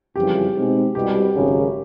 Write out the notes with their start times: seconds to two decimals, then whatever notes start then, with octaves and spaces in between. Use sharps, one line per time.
0.15 F#1 F2 C#3 E3 G3 G4
0.55 B2 G#3 C4 D#4 G#4
0.95 C2 B2 G3 G4
1.34 G#1 F#2 C#3